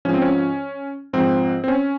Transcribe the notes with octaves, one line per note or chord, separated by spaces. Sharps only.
G#2 F3 C#4
C4
C#4
G#2 F3 C4
C4
C#4